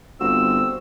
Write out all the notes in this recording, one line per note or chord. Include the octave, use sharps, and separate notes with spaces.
G1 C4 F#4 C5 F5 E6